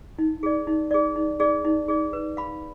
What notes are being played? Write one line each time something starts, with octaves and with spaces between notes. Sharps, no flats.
D#4
G#4 D5
D#4
G#4 D5
D#4
G#4 D5
D#4
G#4 D5
B4
F5 B5